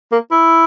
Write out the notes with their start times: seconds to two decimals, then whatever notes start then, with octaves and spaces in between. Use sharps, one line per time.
0.12 A#3
0.32 E4